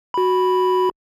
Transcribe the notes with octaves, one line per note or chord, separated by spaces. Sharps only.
F#4 B5